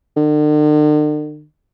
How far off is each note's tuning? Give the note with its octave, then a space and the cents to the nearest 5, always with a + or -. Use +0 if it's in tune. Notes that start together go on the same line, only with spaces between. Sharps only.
D3 +45